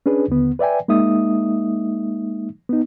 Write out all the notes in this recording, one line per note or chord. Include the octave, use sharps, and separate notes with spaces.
C#4 D4 G#4 B4
D#2 D3 B3
B4 D5 E5 G5 G#5
G#3 A#3 D#4 E5 D#6
B3 D#4